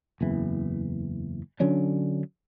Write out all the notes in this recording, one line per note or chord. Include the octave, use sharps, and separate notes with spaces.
F#1 E2 E3
D3 F#3 C#4 D4